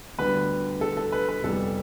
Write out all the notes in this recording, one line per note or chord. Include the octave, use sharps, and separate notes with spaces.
D2 D3 G3 B3 B4
A4
A4
B4
B4
F1 F2 E3 G3 B3 A4